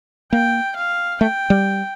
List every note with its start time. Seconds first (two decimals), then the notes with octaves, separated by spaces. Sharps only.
0.32 A#3 G5
0.76 F5
1.21 A3 G5
1.50 G3